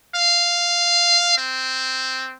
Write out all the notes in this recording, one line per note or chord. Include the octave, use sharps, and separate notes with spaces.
F5
C4